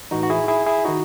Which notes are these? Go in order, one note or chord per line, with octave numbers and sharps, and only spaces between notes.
A2 E3 D#4 F#4
F#4
E4 G#4
E4 G#4
E4 G#4
D#3 D#4 F#4